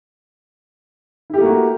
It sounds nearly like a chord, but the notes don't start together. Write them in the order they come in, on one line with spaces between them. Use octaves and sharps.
E4 G4 A3 A#3 F#4